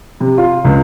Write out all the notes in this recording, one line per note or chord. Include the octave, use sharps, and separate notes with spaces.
C3
F4
C#2